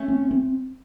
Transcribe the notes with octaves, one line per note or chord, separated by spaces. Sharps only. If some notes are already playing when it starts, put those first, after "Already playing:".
Already playing: A3 C#4
C4
C4